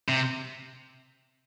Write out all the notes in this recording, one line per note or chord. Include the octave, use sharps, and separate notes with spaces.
C3